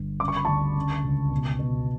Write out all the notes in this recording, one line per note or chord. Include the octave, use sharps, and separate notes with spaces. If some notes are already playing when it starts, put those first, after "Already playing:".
Already playing: G1
C#3 D6
C#6
B5
D2 A5 C#6
C#3
C#2
B2
B2